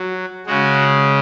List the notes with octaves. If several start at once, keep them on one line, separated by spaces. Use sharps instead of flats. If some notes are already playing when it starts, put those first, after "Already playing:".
Already playing: F#3
C#3 G#3 F#4